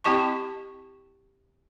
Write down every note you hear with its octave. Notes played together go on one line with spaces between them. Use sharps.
C4 E4 G4 D#5 A5 C#6